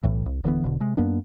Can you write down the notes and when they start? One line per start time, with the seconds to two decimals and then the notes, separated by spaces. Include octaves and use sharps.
0.03 B1 A2 E3
0.26 C2
0.44 D1 D3 E3 B3
0.64 E1 B2 D3
0.80 C3 G#3
0.97 F#2 A#3 B3 D4